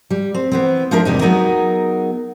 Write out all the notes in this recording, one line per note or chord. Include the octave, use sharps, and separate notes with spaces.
G3
C4
E3 B3 C4
F3 D4 F4 G#4 A#4 E5
E2 C3 G3 D#4
F#3 B3 D#4 G#4 A#4